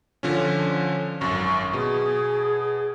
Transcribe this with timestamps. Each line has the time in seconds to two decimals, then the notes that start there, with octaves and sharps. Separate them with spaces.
0.23 D3 F3 C#4
1.21 G#1 F#2 C#6
1.73 B2 G#4